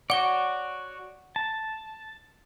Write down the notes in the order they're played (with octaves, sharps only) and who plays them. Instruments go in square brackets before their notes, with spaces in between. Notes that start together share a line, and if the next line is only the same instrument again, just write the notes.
[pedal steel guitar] F#4 C#5 D5 [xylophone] F#5 G7
[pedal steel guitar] A5